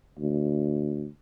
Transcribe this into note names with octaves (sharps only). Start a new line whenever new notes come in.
D2